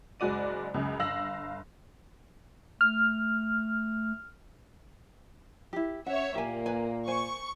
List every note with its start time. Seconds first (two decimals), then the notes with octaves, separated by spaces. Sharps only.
0.20 F#1 G#3 F#4 D5 D#7
0.74 C#2 F#2 C#3
0.99 G1 F5 E6 A#6 F#7
2.81 A3 F6
5.73 E4 G4
6.06 C#4 C#5 E5 F#5
6.35 A#2 A#3 G4 G#5
6.66 B4 G#5
7.08 C5 G#5 C#6